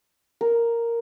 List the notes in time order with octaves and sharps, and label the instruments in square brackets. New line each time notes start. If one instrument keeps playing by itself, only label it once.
[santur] A#4